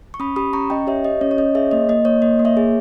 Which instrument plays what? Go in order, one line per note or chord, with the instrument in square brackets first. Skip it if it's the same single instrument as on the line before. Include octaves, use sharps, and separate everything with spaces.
[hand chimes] C#6
C#4 B5 D#6
G4 B5 D#6
C#4 A#5 C#6
C#4 D#5 G5
G4 C#5 E5
G4 D#5
C#4 C#5
C#5
C#4 D#5
G#4 C#5 E5
A#3 D#5
A#3 D#5
A#3 C#5
A#3 D#5
A#3
C#5 E5
G#4